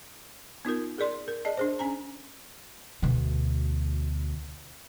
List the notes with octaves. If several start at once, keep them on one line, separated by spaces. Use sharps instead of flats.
B3 D#4 F4 A#4
G#4 A#4 D5 C6
A#4
G#4 D5 D#5 A5
D4 G#4 C5
C#4 G#5 A#5
D2 B2